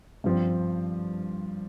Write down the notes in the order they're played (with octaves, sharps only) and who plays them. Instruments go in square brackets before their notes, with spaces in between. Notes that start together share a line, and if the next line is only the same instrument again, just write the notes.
[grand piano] G2 F3 C4